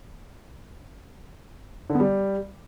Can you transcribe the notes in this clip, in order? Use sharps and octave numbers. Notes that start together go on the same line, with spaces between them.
D3
B3
G3